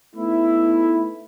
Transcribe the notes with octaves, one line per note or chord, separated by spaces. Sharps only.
A3 B3 D#4 E4